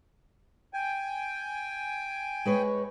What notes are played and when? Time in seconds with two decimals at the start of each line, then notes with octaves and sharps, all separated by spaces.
0.74 G5 G#5
2.45 G#3 B4 C#5